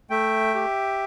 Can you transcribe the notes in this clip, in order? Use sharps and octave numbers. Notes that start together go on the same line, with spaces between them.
A3 E5 G5
G4